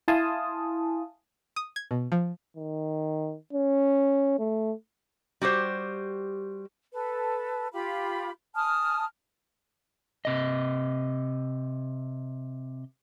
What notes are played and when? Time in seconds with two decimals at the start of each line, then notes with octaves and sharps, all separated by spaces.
0.08 E4 F5 G#5 A5 C6 D#6
1.56 D#6
1.76 G#6
1.91 B2
2.12 F3
2.57 D#3
3.53 C#4
4.39 A3
5.41 G3 F#4 G4 C5
6.93 A4 B4
7.73 F4 G4 B5
8.54 G#5 A5 D#6 F6
10.25 C3 D#5